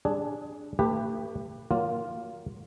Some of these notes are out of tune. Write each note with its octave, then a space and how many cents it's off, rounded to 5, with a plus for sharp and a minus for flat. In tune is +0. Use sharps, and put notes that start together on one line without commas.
G3 +35 D4 +0 G#4 +10
A3 +45 G4 +15 B4 +0
F#3 +20 A#3 +0 F4 +0